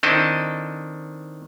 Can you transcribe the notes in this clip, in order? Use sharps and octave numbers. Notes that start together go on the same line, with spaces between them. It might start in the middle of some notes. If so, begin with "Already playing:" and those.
D#3 C4 D4 E4 A4 D#5